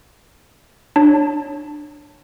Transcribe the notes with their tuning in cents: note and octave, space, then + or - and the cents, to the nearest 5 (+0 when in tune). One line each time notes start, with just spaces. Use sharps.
D4 +15 C#5 -5 A5 +5